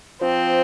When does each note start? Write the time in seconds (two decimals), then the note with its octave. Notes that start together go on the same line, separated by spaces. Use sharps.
0.22 F3 C4